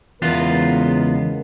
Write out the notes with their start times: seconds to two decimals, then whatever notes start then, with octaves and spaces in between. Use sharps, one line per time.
0.22 E2 C#3 G#3 B3 F4 A#4